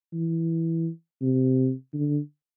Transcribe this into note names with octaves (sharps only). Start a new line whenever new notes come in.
E3
C3
D3